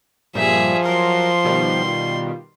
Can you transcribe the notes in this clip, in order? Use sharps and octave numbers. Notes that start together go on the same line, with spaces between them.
G2 A#2 F3 G3 G#4 E5
F#3 A#4 C6
B2 D#3 G3
F4